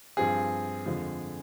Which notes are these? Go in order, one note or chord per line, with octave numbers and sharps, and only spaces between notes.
G2 F3 C4 G#4
F2 D3 F3 G#3